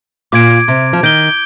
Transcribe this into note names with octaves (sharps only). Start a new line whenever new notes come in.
A#2 D6 G#6 D7
C3
F3
D#3 G6 D7 G7